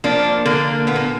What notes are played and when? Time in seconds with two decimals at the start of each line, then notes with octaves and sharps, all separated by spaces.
0.04 F3 A#3 D4
0.46 D3 A#3
0.87 A#2 B3
0.96 A#3